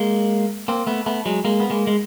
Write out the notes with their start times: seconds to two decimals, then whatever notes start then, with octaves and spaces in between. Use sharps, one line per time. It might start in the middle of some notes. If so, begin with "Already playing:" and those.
Already playing: G#3 A#3
0.68 A#3 C4
0.87 A3 B3
1.06 A3 B3
1.26 F#3 G#3
1.45 G#3 A#3
1.60 B3
1.70 G#3 A#3
1.87 G#3